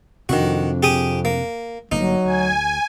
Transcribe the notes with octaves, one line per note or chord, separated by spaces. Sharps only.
F2 C3 D#3 C4 D4 F#4
G4 G#4 D#6
A#3
G1 F#3 A#3 D#4
D2 G#5